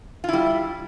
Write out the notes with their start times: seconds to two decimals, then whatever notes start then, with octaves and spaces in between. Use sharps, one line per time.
0.24 F4
0.29 E4
0.33 G3